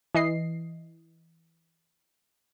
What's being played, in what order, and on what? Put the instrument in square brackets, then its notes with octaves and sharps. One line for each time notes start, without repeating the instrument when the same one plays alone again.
[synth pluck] E3 D#5 C7